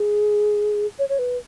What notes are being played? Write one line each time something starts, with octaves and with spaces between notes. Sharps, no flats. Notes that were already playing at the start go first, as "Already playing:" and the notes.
Already playing: G#4
C#5
C#5
B4